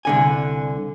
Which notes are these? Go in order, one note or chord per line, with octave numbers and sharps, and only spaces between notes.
C2 D3 G#5